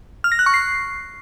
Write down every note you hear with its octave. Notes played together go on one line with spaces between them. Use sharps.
F6
A#6
F#6
C#6
C7